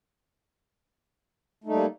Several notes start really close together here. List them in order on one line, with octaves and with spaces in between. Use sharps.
A3 D#4 G3 A#3